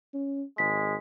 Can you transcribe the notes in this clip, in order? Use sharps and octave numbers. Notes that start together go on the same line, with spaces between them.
C#4
G#1 G#3 B6